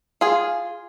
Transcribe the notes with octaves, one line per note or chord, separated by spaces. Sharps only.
F4 G#4